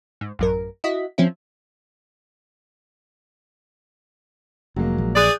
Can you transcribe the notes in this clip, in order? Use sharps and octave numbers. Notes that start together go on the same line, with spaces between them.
G#2
A1 F#2 A#4
E4 F#4 D#5 B6
F3 C4 C#4 E4
F1 F#3 G#3 A#3
A#1
G#4 D5 F#6 G6